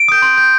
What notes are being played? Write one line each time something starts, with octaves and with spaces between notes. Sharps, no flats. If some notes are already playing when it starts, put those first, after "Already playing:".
Already playing: D7
D#6 G6
C6
G6